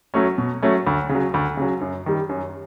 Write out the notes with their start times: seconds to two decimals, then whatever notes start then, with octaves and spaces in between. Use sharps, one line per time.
0.14 F#3 A3 C#4
0.38 B2
0.62 F#3 A3 C#4
0.87 D2
1.09 C#3
1.15 F#3
1.34 D2
1.57 C#3 F#3
1.81 F#2
2.06 D#3 G3
2.29 F#2